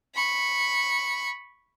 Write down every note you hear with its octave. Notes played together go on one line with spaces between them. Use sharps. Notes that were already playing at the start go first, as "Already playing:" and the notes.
B5 C#6